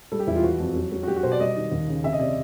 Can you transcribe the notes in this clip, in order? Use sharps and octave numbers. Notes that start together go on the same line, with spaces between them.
G3 A4
G4
E2 E4
F4
E3 F#4
F2
F#3
F#3
F#4
F#3 G4
F#4
B2 C5
D5
G3 D#5
D#3
D#2
C#3
C3 E5
D#5
C3 D5